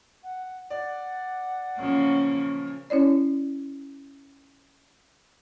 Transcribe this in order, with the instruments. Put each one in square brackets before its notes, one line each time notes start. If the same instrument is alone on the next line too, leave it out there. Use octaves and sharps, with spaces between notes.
[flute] F#5
[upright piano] D5 [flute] F#5
[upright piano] B1 A#2 F3 [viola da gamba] C#3 A#3 C#4
[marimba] C#4 E4 C#5 D5